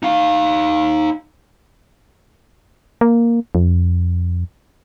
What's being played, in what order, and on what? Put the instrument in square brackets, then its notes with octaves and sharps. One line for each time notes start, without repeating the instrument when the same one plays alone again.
[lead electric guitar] D#4 F5
[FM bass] A#3
F2